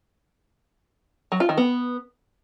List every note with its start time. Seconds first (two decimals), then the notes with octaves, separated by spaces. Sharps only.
1.32 F#3
1.40 F4
1.49 D#3
1.57 B3